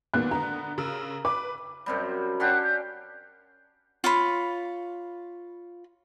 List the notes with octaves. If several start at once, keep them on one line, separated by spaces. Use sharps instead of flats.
G#1 A#2 D#3 B3 F#6
D3 B3 A#5
C#3 A#4 E6
B4 D6
F#2 C3 G3
C#4 D4 G4 F#5 G5 F#6
G6
F4 C#5 B5